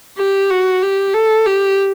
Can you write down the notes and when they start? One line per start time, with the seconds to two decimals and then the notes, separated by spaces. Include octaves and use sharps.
0.18 G4
0.50 F#4
0.82 G4
1.14 A4
1.46 G4